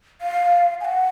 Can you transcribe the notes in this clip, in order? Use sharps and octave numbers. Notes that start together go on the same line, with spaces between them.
F5
G#5
F#5